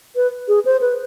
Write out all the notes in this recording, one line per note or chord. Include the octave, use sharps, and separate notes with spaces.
B4
G#4
C5
B4